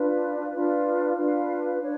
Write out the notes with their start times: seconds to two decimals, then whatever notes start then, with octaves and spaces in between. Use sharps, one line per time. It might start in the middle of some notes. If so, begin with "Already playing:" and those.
Already playing: D4 F4 B4
0.50 D4 F4 B4
1.16 D4 F4 B4 F5
1.81 D4 C#5